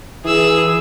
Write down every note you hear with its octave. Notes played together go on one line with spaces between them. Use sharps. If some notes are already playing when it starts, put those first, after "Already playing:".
E3 G#4 E6